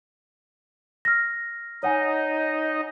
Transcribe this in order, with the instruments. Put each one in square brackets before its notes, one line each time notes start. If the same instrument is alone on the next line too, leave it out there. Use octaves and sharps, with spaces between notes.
[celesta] F6 A#6
[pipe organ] D#4 D#5 [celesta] C#5 F#5 G#5